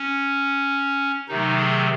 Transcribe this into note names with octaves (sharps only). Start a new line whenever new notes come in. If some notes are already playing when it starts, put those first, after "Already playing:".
Already playing: C#4
C3 D#3 F#3 A3 D#4
G#4